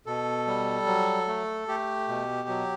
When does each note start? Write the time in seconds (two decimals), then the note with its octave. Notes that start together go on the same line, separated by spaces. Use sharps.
0.06 B2 A4
0.47 G3
0.86 F#3
1.28 A3
1.68 A3 G4
2.08 B2
2.48 F#3